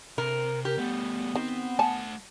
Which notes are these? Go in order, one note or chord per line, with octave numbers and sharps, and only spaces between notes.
C3 A#4
G4 A#4
G3 A3 B3
D#3 C4
A3 F#5 G#5 A5